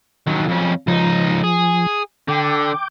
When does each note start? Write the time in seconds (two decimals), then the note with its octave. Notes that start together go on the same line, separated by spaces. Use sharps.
0.27 D#2 F#3
0.49 F2 C#4
0.87 C#2 F3 D#4
1.43 G#4
2.28 D3 G5 D6